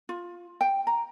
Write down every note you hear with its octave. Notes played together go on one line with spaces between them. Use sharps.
F4
G5
A#5